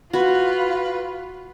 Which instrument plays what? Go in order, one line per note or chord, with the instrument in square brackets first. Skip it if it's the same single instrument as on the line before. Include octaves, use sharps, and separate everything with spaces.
[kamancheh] F4 [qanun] F#4 [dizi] B4